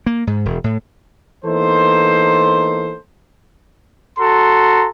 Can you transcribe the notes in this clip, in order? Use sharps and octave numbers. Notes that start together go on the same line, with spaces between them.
A#3
G#2
E1
A2
E3 A#3 B3 D#4 A4 C5
F#4 A4 A#5 C6